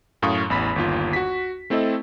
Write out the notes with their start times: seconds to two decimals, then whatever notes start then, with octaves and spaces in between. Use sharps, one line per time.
0.22 F#2 A2 F5 C#6 D#6
0.50 A1 E2 B5 B6
0.76 G1 D#2 F4
1.13 F#4 B6
1.70 A3 C4 E4 A4 D#5